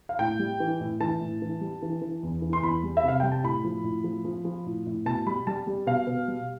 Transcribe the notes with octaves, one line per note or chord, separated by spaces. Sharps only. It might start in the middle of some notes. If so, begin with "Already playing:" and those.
F5
A2 G5
G3
E3
A2
E3 A5
A2
E3
G3
E3
E3
E2
E3
C6
E2 B5
G3
E5
C3 F5
G3 G5
A5
A2 B5
F3
A2
F3
F3
F3
A2
A2
B2 A5
G3 B5
G3 A5
G3
B2 F5
B2
G3